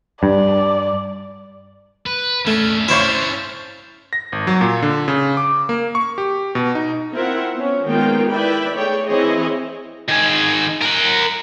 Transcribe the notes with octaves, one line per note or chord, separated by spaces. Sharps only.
G2 D5
B4
A3 C#4 D4
E4 C5 C#5 E5 F5
A#6
G#1
F#3
A#2
D3
C#3
D6
A#3
C#6
G4
B2
D#4
C4 E4 F4 A#4 E5 F#5
B3 C#4
D#3 G#3 A#3 B3 F4 G5
E4 B4 D5 E5 G5 B5
A3 G#4 C#5 D5 G5
E3 C4 E4 G#4 C#5 D#5
D#3 G#4
A#4 F#5